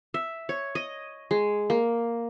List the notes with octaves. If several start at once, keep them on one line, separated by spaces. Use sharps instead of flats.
E5
C#5
D#5
G#3
A#3